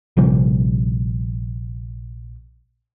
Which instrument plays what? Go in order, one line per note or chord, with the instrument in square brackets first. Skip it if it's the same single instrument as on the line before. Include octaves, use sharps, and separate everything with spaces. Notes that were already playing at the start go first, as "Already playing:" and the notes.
[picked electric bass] A#1 C3 F3 G3